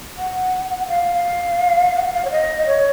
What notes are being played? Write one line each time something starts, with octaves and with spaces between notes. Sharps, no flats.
F#5
F5
F#5
F#5
F5
C#5
D#5
C#5